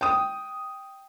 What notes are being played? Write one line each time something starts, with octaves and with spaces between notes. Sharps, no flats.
G5 D#6